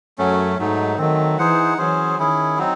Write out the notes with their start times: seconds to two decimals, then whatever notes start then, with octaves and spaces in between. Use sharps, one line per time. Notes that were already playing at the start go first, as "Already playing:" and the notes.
0.18 F#2 F#3 A3 C#4
0.58 G#2 F#3 A3 D#4
0.98 D#3 F#3 A3 C4
1.38 E3 D#4 G#4 C5 F#5
1.78 E3 F#3 C#4 G#4 C5
2.18 D#3 C#4 E4 G#4
2.58 F#3 C4 D#4